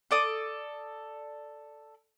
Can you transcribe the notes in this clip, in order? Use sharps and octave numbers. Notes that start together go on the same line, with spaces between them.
A4 D5 D#6